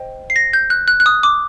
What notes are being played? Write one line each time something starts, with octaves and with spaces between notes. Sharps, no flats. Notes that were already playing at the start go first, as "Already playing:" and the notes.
Already playing: C5 D#5 G5
C7
A#6
G6
F#6
F#6
F#6
D#6
D6